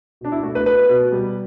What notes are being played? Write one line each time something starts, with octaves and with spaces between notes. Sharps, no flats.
B2 D4
E4
A3 F#4
B4
B2 B4
B2
G3